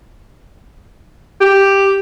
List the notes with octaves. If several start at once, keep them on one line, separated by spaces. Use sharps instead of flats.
G4